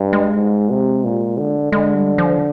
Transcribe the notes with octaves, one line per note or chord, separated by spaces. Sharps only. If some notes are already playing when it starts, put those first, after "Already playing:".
Already playing: G2
G#3
G#2
C3
A#2
D3
D3 G#3
G3
F3